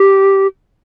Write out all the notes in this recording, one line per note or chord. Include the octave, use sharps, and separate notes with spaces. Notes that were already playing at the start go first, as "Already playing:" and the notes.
Already playing: G4